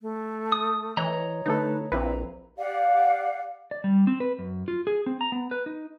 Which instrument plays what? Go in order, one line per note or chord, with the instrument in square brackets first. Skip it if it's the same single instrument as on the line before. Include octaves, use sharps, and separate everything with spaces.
[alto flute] A3
[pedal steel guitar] D#6
[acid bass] E3 [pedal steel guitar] C#5 D#5 A#5
[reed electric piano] D3 A3 A4 [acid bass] D#4 [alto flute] B4
[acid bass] A#1 [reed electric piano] C4 E4 B4 [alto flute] A#5
[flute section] G4 D5 F5 F#5
[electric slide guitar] D5
G3
C4
B4
F#2
F4
G#4
C4
A#5
B3
B4
D#4